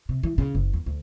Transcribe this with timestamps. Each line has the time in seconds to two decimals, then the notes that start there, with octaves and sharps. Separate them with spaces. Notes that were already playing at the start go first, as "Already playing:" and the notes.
0.09 C3
0.23 E3
0.38 C#3
0.55 F#1
0.73 E2
0.86 D2